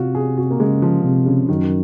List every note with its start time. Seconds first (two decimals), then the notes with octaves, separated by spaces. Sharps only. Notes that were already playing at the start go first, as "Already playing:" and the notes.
Already playing: C3 F4 F#4
0.15 G#4
0.37 F#4
0.51 A#3
0.60 C#3 G#3
0.82 F3
1.04 C3
1.26 C#3
1.49 F#2 D#3